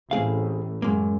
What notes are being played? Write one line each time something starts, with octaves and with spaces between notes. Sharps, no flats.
A1 A2 C4 G#4 F5
F#2 G#3 A#3